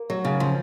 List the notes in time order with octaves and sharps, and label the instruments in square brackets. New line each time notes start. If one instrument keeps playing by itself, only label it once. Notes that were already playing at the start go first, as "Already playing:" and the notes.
Already playing: [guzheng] A#3
[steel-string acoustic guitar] F#3
C#3
F3